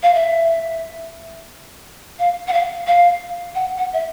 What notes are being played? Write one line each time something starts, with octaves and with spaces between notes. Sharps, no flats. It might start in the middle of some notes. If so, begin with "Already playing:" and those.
F5
E5
F5
F#5
F5
F5
F#5
F#5
E5